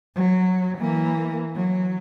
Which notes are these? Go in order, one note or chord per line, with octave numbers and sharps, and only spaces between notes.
F#3
E3 A#3
F#3